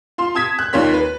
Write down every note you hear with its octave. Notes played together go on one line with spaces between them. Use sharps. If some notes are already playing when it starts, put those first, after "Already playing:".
F4 C6
A5 D#6 G#6 B6
F#6
D#2 D#4 F4 C#5 C6 B6
B4